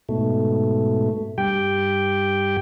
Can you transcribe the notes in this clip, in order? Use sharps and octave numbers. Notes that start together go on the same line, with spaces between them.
G#2 B2 A3
G2 G4 G5